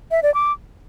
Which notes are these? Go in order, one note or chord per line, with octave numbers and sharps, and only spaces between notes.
E5
D5
D6